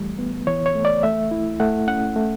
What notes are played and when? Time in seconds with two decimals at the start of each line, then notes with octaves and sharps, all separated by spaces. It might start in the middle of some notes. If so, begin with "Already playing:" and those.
Already playing: E3 G3 A3
0.19 B3
0.47 E3 C#5
0.66 C#5
0.75 A3
0.85 D5
1.03 A3 E5
1.31 E4
1.60 A3 F#5
1.88 C#4 F#5
2.16 A3